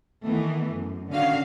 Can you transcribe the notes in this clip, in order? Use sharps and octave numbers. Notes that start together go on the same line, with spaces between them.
D#3 E3 A3 B3
F#2
D3 D#3 C#4 F#4 F5